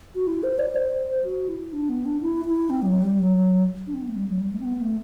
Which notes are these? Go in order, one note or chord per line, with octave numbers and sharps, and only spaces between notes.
F#4
E4
C5
D5
C5
F#4
E4
D4
B3
D4
E4
E4
C4
G3
F#3
G3
F#3
D4
C4
B3
A3
G3
F#3
G3
A3
C4
B3
A3